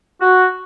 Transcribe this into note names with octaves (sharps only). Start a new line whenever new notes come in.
F#4